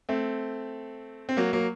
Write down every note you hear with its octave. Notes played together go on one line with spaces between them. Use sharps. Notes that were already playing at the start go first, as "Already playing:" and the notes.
A3 C4
C4
F#3 A#3
F#3 A#3